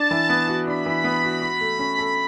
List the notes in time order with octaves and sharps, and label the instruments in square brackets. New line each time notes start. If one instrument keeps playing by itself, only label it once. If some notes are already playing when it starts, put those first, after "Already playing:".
Already playing: [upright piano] D4 [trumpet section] A5
[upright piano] E3
B3
F#4
[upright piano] D4 [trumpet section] B5
[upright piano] E3
B3
F#4
F#4
A3
C#4
A4